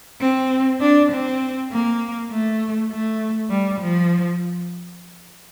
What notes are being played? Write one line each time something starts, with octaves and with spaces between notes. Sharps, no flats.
C4
D4
C4
A#3
A3
A3
G3
F3